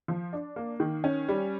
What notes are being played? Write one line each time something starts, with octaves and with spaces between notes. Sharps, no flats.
F3
D4
A#3
D#3
C#4
G3